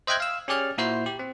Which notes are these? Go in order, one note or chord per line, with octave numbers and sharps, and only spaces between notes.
C5 D#5 E5 G5 F#6 G#6
F5 E6
C#4 G4 G#4 D5 F6
A#2 E4 F#4 C5 C6 C7
G4
C4